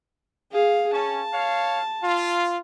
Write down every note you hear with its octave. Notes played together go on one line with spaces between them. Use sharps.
G#4 F5
C#4 A5
C#5 F5
F4